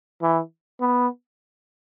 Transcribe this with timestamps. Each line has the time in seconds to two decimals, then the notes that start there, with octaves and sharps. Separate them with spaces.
0.22 E3
0.81 B3